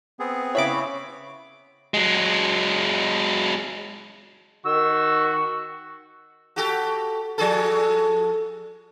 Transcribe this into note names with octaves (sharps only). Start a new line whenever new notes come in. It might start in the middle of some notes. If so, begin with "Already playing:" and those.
B3 C4 G#4
C#3 E4 C#5 B5 D6
F#3 G#3
D#3 F#4 E6
F#4 G4 A4
F3 G#4 A4